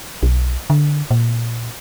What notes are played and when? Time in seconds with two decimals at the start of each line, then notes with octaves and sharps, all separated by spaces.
0.23 B1
0.70 D3
1.11 A#2